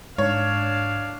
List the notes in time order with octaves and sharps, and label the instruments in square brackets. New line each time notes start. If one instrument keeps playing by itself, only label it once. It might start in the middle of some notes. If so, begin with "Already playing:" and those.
[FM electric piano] G#2 [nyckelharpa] D4 F5 [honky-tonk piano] C#5